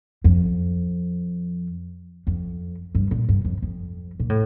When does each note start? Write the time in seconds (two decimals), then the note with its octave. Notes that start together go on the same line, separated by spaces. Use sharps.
0.24 F2
2.27 F2
2.95 G2
3.11 A#2
3.29 G2
3.45 F2
3.62 F2
4.20 A#2
4.30 A2